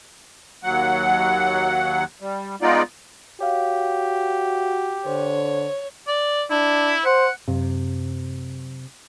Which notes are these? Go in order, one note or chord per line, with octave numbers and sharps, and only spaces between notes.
D#2 F#3 F#5
G3
G#3 B3 D#4 F4 D5
F#4 G4 C#5 F5
D3 C5 C#5
D5
D4 E4
C5 F#5
F#2 C3